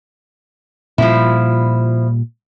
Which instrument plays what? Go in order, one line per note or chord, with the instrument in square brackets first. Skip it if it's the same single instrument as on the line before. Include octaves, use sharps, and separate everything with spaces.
[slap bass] A#2 G3 [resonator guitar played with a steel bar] F3 E4